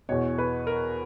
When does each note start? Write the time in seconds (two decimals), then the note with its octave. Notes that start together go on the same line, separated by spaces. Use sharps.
0.09 E2 B2 C#5
0.38 B4
0.67 A#4